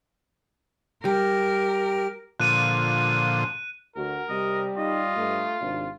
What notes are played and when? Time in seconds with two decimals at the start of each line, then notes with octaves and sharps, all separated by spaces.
1.05 G3 G4 A#4
2.40 A#2 D3 F3 F#6 D#7
3.96 D2 F#4 A#4
4.29 C3 G3 D#5
4.78 D#4 F4 D#5
5.17 G2 A3
5.61 G#1 C3 D4